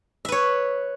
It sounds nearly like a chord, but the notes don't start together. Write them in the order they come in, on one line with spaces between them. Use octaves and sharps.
E5 B4 C#5